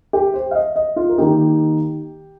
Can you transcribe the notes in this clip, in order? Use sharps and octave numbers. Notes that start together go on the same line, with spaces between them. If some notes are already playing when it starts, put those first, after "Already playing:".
G4
C5
F5
D#5
D#5
F4
A#4
D#3 A#3 D#4 G4